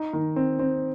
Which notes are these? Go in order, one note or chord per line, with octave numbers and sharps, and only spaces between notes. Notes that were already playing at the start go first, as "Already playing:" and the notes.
Already playing: D#4
D#3
C4
C4